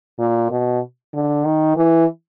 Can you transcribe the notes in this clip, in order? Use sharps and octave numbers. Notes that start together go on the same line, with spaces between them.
A#2
B2
D3
D#3
E3